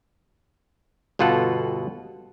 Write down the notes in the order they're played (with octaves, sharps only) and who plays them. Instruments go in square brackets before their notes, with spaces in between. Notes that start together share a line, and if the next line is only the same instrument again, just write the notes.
[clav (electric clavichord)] G1 B2 F4 A4 F#5